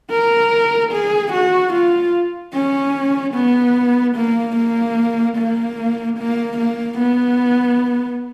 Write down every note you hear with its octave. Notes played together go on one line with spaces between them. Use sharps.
A#4
G#4
F#4
F4
C#4
B3
A#3
A#3
A#3
A#3
A#3
B3